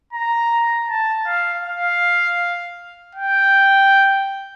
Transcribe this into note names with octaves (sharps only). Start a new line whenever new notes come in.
A#5
A5
F5
F5
G5